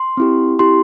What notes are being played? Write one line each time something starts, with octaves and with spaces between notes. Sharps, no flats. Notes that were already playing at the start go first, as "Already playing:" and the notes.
Already playing: C6
C4 E4 G4
C4 E4 G4 C6